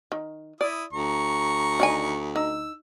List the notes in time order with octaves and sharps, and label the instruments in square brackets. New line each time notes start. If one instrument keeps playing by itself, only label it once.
[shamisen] D#3
[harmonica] E4 D#6 [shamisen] D5
[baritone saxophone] D2 [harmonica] A#5 C#6
[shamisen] D#3 D5 G#5
[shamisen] D#4 [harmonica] E6